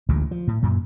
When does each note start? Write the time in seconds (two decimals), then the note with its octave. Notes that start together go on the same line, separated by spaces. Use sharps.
0.09 A1 D2 A#2 G#3
0.31 F3
0.47 A2
0.62 F#2 A#2